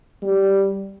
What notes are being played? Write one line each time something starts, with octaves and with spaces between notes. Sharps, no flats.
G3